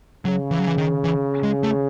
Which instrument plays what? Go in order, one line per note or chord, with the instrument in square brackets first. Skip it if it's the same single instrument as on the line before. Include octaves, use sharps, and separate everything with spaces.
[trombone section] C#3 [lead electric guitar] F#3
[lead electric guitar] E3
F#3
E3
D#3
E3
G#3
A3